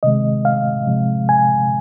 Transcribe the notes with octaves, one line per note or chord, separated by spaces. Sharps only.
C3 D#3 G#3 D#5
F5
C3 F3 G#3
G#5